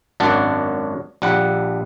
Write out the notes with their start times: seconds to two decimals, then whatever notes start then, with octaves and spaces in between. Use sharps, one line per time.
0.20 G#1 F#2 D4 F#5 A5
1.22 A#1 G3 F#5